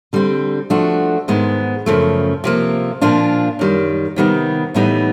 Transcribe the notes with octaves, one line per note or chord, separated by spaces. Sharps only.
D3 G3 C4
F3 A3 D4 F#4
G#2 D#3 G#3 B3
F#2 C#3 F3 A3
C3 F3 A#3
A#2 F3 A#3 D4 F4
F#2 D#3 G3
C3 D#3 G3 B3 D#4
A2 E3 G3 B3 D#4